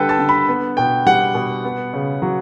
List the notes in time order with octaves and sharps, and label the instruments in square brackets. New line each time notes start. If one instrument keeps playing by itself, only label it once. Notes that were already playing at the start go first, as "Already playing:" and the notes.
Already playing: [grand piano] D3 G3 A4 B4 G5
A5
D3
B5
B3
B2 G5
G3 F#5
B2
B3
C#3
F#3